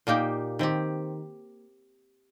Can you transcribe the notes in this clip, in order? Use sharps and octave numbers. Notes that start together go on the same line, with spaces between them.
A#2 A#3 D#4 G4
D#3 C4 G4